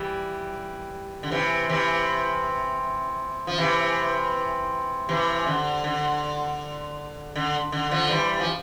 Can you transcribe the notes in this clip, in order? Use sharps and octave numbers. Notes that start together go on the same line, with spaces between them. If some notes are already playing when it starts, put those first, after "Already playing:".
Already playing: E3 G3
D3
C3 E3
C3 E3
F3
C3 E3
C3 E3
D3
D3
D3
D3
D3 F3
E3 G3
F3